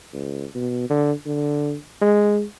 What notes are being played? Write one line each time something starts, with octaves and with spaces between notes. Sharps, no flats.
C#2
B2
D3
D3
G#3